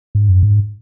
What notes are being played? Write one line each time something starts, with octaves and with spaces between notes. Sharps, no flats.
G#2
F#2
G#2